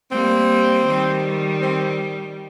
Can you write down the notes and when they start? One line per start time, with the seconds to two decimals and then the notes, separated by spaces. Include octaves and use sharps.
0.11 G3 A#3 C4
0.86 D#3 G3
1.61 C4